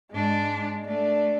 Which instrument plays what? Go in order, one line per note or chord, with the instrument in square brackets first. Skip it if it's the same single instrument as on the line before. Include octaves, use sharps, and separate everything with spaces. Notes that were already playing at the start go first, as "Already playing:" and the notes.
[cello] G#2 D4 [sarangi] G#3
[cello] A3 [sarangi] D4